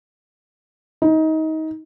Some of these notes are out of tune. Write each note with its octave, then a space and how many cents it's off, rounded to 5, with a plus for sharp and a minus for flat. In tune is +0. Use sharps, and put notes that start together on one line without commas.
D#4 +25